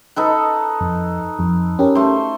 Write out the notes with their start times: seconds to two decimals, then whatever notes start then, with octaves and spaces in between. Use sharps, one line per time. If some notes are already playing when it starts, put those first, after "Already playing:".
0.16 D#4 A4 B4
0.81 F2
1.39 F2
1.79 C#4 G4 A#4
1.95 A3 C5